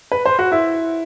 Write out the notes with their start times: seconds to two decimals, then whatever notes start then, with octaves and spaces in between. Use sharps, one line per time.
0.12 B4
0.26 C5
0.39 F#4
0.52 E4